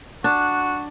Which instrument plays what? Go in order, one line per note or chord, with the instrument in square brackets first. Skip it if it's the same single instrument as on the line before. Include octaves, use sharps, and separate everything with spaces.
[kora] D4 [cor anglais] F#4